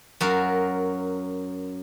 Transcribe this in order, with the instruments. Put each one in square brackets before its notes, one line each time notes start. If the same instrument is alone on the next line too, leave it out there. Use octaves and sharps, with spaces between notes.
[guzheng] F#2 F#4 A#4 F5